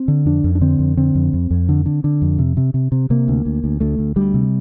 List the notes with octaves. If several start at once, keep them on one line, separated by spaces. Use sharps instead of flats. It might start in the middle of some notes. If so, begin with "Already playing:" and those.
Already playing: C4
D3
F2 D4
F2
D4
D3 C4
F2
D3 C4
F2
F2
F2
D3
D3
D3
F2
C3
C3
C3
C3
C3 A#3
D2
D2
D2
D2 A3
D2
D2 G3
C3